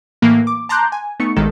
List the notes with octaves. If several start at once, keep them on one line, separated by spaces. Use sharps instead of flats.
A2 E3 A#3
D6
A5 A#5 C6 D6 F#6 G6
G#5
A3 B3 D#4 C#6 C#7
A1 D#3 G#3 A4